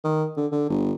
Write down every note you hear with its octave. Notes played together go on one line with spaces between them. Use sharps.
D#3
D3
D3
G1